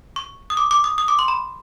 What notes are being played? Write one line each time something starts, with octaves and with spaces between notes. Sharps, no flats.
C#6
D#6
D6
D6
D#6
D#6
D6
C6
B5